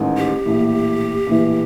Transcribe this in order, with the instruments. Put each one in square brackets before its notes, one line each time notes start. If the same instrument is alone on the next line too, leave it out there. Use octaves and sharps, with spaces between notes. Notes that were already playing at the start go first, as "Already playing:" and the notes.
Already playing: [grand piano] A1 G#2 D#3
[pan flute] G4
[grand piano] A#1 A2 E3
A#1 A2 E3